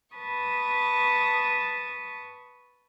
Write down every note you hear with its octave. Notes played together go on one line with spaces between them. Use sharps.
B4 A5 C#6 D#6